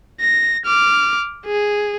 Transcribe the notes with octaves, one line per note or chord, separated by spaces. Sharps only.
A#6
D6 F6
G#4